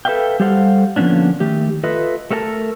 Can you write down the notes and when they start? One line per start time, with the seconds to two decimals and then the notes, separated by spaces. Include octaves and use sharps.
0.05 A4 B4 D5 E5 F5 G5
0.40 G3 G4 A4 C5 F5 F#5
0.96 D3 F3 A#3 B3 C#4 D4
1.40 D#3 A3 G4
1.84 F4 A4 B4 D#5 E5
2.31 A3 A4 A#4 F#5 A5